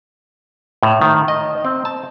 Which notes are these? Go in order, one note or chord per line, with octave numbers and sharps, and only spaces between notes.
A2
D#3
D#5
C4
A5